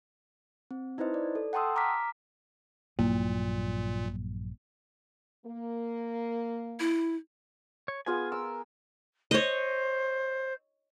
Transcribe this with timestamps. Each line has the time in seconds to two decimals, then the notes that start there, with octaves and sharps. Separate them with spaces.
0.71 C4
0.98 D#4 E4 B4 C5 D#5
1.14 D5
1.35 A4
1.53 F#5 G5 A5 C6 D#6 E6
1.76 A#5 D6 F6 B6
2.99 A#1 G2 A#2 F#3 A#3
5.45 A#3
6.80 E4
7.88 C#5
8.06 B3 F4 G#4 G#5
8.32 A#4 E6
9.31 C5 C#5 D#5